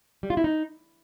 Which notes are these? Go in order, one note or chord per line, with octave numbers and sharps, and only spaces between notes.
G3
F4
E4
D#4